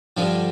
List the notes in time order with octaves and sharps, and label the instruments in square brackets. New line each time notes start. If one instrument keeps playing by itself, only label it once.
[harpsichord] G2 D3 F3